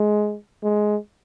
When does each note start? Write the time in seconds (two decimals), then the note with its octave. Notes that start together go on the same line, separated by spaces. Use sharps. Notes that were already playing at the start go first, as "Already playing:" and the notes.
Already playing: G#3
0.63 G#3